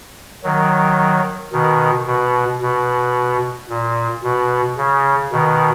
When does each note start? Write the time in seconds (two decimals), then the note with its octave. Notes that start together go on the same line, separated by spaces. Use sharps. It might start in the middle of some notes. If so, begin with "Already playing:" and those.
0.44 D#3 F#3
1.52 B2 D#3
2.06 B2
2.61 B2
3.69 A#2
4.23 B2
4.77 C#3
5.32 B2 D#3